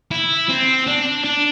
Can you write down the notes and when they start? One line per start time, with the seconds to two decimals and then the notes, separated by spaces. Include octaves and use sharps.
0.11 E4
0.49 C4
0.87 D4
1.24 D4